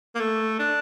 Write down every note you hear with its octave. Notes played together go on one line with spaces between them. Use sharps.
A#3
A3
D4